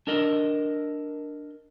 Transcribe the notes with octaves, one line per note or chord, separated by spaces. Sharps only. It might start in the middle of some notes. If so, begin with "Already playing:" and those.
D4 A4 A#4 D#5